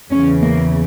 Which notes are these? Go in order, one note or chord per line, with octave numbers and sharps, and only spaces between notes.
E2 C#3 E3 C#4
A#3